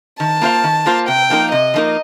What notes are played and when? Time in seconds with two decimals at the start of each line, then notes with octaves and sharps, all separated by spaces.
0.20 D#3 A5
0.42 A#3 F4 C5 F5
0.64 D#3
0.86 A#3 F4 C5 F5
1.08 C3 G5
1.30 F3 A#3 D#4 A#4
1.52 C3 D#5
1.74 F3 A#3 D#4 A#4